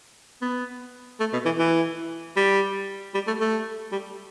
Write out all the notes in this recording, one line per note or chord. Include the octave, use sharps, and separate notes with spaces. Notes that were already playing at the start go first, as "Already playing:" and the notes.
B3
A3
B2
E3
E3
G3
G3
A3
A3
G3